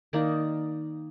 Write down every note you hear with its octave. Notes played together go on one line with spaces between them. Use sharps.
D#3 A#3 D#4 D5